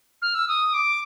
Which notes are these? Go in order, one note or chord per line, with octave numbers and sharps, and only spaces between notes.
F6
E6
D#6
D6